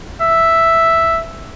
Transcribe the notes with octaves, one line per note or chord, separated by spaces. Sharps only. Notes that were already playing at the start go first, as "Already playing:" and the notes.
E5